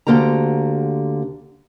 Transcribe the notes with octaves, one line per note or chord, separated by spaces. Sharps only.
D2 D3 A#3 G4 A#5